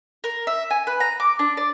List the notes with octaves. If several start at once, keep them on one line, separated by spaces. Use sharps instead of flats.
A#4
E5
G#5
B4
A#5
D6
D4
D5